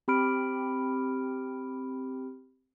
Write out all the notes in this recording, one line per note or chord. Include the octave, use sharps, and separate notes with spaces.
C4 G4 B5 F6 D7